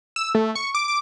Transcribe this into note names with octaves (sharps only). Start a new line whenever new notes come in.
E6
A3
C#6
D6
D6